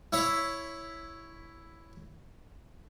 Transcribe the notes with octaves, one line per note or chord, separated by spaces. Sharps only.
E4 C#5 E5